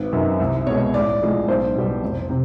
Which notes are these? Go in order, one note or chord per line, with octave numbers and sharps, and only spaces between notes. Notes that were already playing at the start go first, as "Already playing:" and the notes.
Already playing: G#1 B4
F#2 D#3
C2
B2 G#3 C#5
A1 D5
A2 F3 G#3
B1 C5
B2 G3
F1
C3